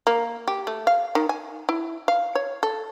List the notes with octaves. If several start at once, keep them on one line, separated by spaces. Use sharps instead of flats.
A#3
G4
A3
F5
D#3
G#5
E4
F5
C#5
A4